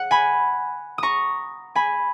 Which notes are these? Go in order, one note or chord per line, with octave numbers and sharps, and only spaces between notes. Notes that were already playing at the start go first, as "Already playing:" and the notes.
Already playing: F#5
G#5 B5
A#5 C#6 D#6
G#5 B5